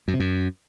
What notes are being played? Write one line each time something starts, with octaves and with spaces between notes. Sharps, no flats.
F#2
C3
F#2